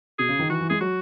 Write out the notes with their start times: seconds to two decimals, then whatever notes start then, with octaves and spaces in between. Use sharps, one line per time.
0.19 B2 G#4
0.29 C#3
0.39 D#3
0.49 E3 F#4
0.61 E3
0.70 G#3 G#4
0.81 F#3 F#4